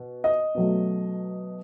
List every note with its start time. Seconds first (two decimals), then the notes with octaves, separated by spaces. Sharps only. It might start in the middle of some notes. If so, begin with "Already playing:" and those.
Already playing: B2
0.24 D#5
0.55 B2 F#3 A3